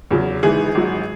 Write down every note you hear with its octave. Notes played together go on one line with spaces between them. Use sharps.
E2 C#3 F#3
G#1 G#2 E3 G#4
G#1 G#2 F#3